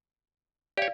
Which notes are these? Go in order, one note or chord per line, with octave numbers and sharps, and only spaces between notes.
G4 C#5 D5 F5